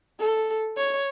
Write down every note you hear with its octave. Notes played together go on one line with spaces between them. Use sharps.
A4
C#5